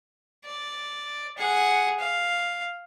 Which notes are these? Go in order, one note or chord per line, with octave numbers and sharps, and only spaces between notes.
D5
G#4 F#5
F5